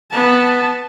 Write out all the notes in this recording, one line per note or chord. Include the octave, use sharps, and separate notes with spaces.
B3 A5